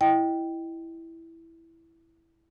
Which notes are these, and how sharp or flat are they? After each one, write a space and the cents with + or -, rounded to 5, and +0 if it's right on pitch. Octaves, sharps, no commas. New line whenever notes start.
E4 +0 D#5 +0 G5 -5